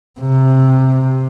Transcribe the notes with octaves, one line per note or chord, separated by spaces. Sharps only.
C3